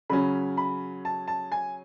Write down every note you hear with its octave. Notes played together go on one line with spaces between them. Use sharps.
C#3 F#3 C#4 B5
B5
A5
A5
G#5